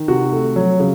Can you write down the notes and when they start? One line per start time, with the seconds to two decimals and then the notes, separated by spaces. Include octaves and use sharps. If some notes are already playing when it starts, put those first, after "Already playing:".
Already playing: D#3
0.08 C3 F#4
0.32 A3
0.56 F#3
0.80 C#3